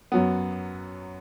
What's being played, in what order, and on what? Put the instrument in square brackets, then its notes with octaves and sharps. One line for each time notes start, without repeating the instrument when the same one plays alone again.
[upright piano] F#2 F#3 B3